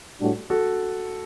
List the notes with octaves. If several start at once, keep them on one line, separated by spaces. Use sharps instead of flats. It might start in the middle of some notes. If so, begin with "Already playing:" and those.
A2 G3 D4 F#4
F#4 A4